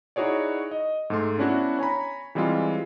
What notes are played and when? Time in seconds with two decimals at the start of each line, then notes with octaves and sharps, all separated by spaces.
0.16 D#4 E4 F#4 G#4 C#5 D5
0.71 D#5
1.10 G#2 A3 C6
1.38 B3 C#4 D4 E4 F#4
1.79 C#5 G#5 A#5 B5
2.35 E3 G3 G#3 C4 F4